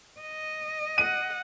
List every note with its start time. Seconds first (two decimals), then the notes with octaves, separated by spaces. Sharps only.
0.21 D#5
0.98 F#5 D#7